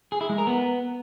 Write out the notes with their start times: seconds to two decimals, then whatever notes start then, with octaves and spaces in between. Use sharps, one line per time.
0.12 G#4
0.21 E4
0.29 G#3
0.38 A#4
0.47 B3